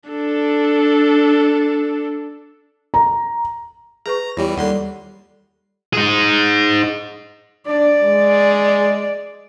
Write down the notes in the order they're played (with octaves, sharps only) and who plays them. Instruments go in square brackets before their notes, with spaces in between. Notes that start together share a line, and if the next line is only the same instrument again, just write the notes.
[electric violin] D4 A4
[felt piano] A#5
[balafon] G#4 B4 C#6 [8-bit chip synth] A#5
[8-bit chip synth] E2 E3 G3 [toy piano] F4 G4 [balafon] C#5
[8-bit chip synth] D#2 C6 C7 [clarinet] G3 [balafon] A4 D5 F#5
[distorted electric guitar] D#4 G#4
[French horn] D4 [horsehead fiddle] D5
[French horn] G#3